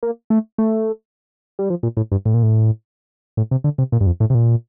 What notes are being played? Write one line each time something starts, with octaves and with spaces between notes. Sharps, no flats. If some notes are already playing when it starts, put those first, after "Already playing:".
A#3
A3
A3
G3
F3
A#2
A2
G2
A2
A#2
A2
A2
C3
D3
C3
A#2
G2
F2
A2
C3
A#2